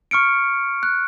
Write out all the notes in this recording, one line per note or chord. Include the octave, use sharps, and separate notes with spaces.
C#6 F6 C#7 D7
F#6